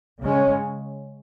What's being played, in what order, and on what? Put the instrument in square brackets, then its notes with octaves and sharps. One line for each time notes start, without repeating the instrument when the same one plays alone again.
[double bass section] C#3 G#3 C#4